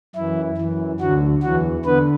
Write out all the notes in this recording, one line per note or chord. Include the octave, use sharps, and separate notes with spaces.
F#2 E3 E4
F#2 E3
D2 D3 F#3 F#4
E2 E3 F#3 F#4
D3 B3 B4